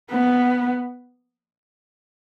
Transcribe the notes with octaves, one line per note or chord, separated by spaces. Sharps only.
B3